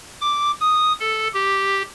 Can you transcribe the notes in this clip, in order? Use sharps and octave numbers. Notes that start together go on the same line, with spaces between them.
D6
D#6
A4
G4